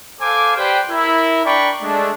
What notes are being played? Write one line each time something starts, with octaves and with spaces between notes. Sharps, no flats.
A4 C5 F5 G#5 D6
G4 B4 C5 D5 G5
E4 A#4
D4 D5 G5 A#5 B5 C#6
G#3 A3 D4